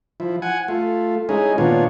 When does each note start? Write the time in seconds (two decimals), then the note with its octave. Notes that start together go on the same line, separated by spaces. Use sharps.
0.20 F3 E4
0.42 F#5 G#5
0.68 A3 F4
1.29 G#3 C#4 D#4 E4 G#4
1.58 A#2 D#3 B3 D4 F4 C#5